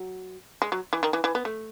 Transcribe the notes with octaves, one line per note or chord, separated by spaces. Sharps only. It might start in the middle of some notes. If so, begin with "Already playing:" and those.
Already playing: F#3
G#3
F#3
E3
D#3
E3
E3
B3
A3